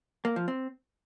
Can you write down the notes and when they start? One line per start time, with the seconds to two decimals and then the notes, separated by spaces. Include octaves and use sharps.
0.25 A#3
0.36 F3
0.48 C4